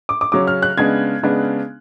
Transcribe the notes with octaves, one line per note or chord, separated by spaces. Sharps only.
D6
D6
C#3 F#3 C#4 D6
F6
F#6
C#3 G#3 B3 D4 G#6
C#3 G#3 B3 D4